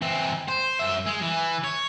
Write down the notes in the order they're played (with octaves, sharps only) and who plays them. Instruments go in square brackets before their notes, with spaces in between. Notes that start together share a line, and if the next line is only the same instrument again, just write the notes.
[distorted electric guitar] E3 C4
C5
F#2 E5
G#3
E3
C#5